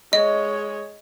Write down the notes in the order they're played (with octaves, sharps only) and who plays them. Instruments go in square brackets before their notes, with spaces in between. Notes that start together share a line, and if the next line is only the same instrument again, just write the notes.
[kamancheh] G#3 C#5 [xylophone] D#5